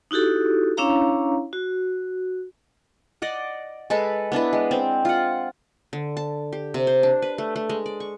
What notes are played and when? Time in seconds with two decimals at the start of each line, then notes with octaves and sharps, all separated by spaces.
0.11 D#4 E4 F#4 G4 A4
0.77 C#4 D4 E4 C#5 F5 A#5
1.53 F#4
3.22 D5 D#5 F#5
3.90 G#3 A4 B4
4.32 B3 D4 E4 B4
4.53 G#3
4.71 C4
5.05 F4 F#5
5.93 D3
6.17 A5
6.52 G4
6.74 C3
6.87 C5
7.03 D4
7.22 B4
7.38 A3
7.56 A3
7.69 G#3
7.86 D5
8.00 C#6